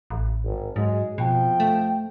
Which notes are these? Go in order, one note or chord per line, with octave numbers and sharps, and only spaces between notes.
A1
G#1
G#2 F#3 G#3
F2 B2 F3 G5
A3